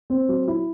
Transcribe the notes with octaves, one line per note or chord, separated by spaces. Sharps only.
C4
F#3
E4